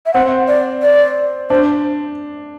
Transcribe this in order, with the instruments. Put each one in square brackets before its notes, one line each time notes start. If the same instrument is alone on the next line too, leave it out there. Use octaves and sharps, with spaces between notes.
[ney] E5
[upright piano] C4 [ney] F#5
[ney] D5
D5
[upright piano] D4 [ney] C5